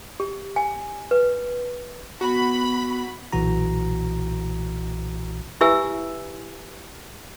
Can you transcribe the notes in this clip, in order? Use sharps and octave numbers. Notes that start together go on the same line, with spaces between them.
G4
G#5
B4
B3 F#4 B5
B1 A#2 E3 F#4 A#5
E4 G4 B4 E5 G#5 E6